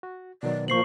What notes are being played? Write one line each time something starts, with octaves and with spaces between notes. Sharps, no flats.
F#4
B2 D#3 F#3 D5
A#2 F3 A#3 C5 C#6 C7 F#7